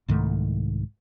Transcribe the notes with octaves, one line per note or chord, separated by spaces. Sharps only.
C2 G#2 D#3 A3